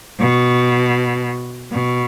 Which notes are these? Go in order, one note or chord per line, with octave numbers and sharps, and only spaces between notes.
B2
B2